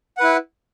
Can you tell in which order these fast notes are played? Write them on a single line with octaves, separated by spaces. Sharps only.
F#5 B4 E4